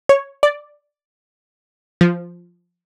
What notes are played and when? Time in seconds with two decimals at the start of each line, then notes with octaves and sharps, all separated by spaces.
0.09 C#5
0.43 D5
2.01 F3